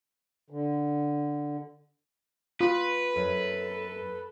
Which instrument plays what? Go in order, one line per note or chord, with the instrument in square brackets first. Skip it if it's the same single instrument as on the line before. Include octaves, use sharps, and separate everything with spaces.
[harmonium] D3
[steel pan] F4 [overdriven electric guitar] B4
[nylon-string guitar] F#2 [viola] A4